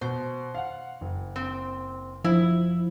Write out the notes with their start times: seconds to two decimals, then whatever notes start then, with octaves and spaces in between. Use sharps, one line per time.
0.01 B2 C5
0.55 F5 F#5
1.01 F#1
1.36 C4
2.24 F3 E4